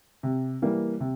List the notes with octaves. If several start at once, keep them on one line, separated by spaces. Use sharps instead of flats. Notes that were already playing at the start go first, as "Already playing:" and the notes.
C3
E3 G3 A#3
C3